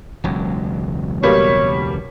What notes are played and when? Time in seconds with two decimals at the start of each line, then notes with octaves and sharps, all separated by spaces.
0.24 E1 C#2 F#3
1.23 B2 G3 A#3 C#5